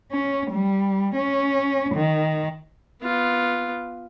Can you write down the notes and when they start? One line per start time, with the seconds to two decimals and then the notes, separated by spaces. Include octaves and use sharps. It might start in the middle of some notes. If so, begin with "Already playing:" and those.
0.12 C#4
0.51 G3
1.16 C#4
1.94 D#3
3.02 B3 F4